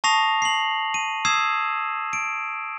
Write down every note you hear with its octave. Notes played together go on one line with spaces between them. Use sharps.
A5 C#6 D#6 A#6 C7 F7
C7 F#7
D#7
D#6 E6 G#6 C7 E7
D7